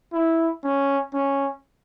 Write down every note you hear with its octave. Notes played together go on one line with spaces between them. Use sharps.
E4
C#4
C#4